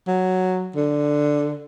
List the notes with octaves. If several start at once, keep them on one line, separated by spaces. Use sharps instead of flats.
F#3
D3